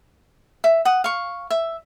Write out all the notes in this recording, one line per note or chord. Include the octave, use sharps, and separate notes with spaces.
E5
F#5 D#6
F5 C#6
E5